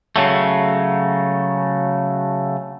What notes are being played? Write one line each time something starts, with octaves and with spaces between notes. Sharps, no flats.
C#3 F#3 A3